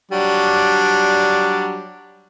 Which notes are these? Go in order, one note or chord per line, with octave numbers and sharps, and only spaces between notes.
F#3 G3 D4